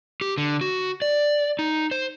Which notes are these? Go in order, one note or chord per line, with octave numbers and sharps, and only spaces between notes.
G4
D3
F#4
D5
D#4
C5